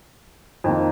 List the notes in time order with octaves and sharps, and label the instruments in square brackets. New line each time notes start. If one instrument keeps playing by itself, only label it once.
[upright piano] F2 D#3 A#3